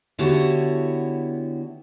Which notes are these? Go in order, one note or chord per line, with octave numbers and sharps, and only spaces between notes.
D3 B3 E4 F#4 G4 C#5